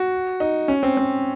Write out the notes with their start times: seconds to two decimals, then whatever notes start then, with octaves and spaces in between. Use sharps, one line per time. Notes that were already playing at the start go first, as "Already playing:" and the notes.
Already playing: F#4
0.40 D#4
0.68 C#4
0.83 C4
0.97 C4